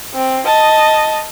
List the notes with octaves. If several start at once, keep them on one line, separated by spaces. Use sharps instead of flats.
C4
D#5 A5